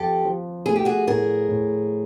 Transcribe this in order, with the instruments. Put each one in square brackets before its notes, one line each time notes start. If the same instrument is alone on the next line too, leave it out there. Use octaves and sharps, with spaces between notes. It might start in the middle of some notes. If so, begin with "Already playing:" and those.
Already playing: [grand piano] F2 F3 [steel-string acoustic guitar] G4 A4
[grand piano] F3
[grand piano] A3 [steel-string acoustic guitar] G#4
[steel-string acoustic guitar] G4
F#4 G#4
[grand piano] A2 [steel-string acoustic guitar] G#4 A#4
[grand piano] A2